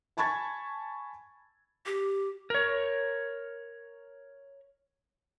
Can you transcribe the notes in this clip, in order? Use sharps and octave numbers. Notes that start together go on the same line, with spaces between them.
G#5 A5 B5 C#6 G#6 A6
G4
A#4 C#5